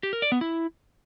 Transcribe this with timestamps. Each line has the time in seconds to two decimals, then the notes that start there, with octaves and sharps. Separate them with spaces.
0.03 G4
0.13 A#4
0.22 D5
0.32 B3
0.41 E4